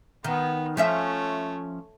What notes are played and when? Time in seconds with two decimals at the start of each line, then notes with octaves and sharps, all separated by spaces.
0.24 D#3 B3
0.77 F3 A3 C#4 C#5 E5